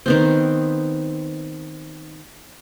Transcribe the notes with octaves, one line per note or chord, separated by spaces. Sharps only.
D#3 B3 C4